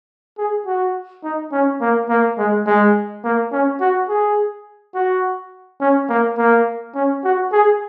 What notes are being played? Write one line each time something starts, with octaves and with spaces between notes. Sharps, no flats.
G#4
F#4
D#4
C#4
A#3
A#3
G#3
G#3
A#3
C#4
F#4
G#4
F#4
C#4
A#3
A#3
C#4
F#4
G#4